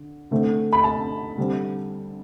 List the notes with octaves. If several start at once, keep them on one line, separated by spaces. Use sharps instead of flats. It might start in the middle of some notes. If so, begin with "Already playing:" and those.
Already playing: D3
D3 A3 C4
B5
A5
D3 G3 C4